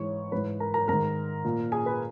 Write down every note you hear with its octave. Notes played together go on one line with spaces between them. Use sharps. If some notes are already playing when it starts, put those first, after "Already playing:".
Already playing: G#2 E3 C#5 C#6
G#2 E3 B4 B5
A#4 A#5
A#4 A#5
G#2 D#3 A#4 A#5
A#2
G#4 G#5
B4 B5